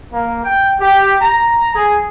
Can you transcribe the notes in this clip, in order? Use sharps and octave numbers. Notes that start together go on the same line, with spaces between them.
A#3
G5
G4
A#5
G#4